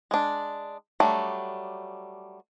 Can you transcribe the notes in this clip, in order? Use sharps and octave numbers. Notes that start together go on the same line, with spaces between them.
G#3 D4
F#3 G3 A3 D4